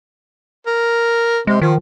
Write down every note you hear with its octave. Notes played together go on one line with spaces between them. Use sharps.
A#4
C3 G#3
D#3 F3